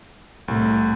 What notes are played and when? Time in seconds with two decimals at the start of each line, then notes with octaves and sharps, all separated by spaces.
0.48 C2 A2